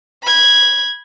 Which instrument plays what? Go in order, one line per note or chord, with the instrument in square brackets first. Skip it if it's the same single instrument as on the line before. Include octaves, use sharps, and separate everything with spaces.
[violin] B5 G#6